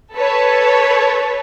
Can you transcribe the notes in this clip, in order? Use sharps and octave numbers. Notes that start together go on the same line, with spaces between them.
A4 B4 C#5